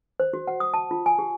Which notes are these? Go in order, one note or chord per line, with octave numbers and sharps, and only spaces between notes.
C5
F#4
F#5
D#6
A5
F4
G#5
G4